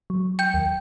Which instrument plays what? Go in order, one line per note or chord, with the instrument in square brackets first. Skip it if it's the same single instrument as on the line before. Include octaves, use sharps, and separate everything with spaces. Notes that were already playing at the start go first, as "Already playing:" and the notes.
[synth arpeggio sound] F#3
[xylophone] G5 G6
[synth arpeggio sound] D#2